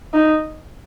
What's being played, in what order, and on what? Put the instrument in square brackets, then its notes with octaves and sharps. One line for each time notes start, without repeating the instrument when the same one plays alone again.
[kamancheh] D#4